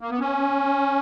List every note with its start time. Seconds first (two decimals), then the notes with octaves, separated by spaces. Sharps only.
0.01 A#3
0.10 B3
0.20 C#4